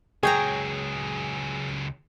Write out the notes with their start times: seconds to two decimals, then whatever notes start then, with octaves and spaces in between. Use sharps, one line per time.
0.23 C#2 F#3 G#4 C#5 G5 A#5